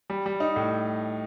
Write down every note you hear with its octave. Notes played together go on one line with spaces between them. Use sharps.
G3
G3
D#4
A2